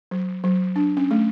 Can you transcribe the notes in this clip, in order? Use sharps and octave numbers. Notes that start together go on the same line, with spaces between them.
F#3
F#3
D4
C#4
A3